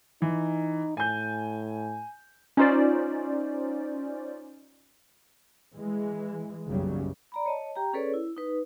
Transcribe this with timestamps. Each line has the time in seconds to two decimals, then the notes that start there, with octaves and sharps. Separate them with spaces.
0.22 E3 D#4
0.97 A2 G#5 G6
2.57 C#4 D#4 F4 C5 D5
5.76 E3 G#3
6.67 F#1 B1 F#2 C#3 F#3 G3
7.32 D5 A#5 B5
7.46 C#5 D#5 A5
7.76 G4 G5 A#5
7.93 C#4 G#4 A4 B4 C#5 D5
8.14 E4
8.37 D#4 B4